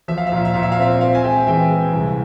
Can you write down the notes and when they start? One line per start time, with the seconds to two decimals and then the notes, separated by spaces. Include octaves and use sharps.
0.08 F3 E5
0.18 F5
0.27 E5
0.32 A#2 F5
0.45 E5
0.54 A#2 F5
0.63 E5
0.72 F5
0.78 C4 E5
1.01 C4 F5
1.15 G#5
1.24 G#3 E5 G5
1.47 E3 E5 G5
1.71 G#3
1.93 C2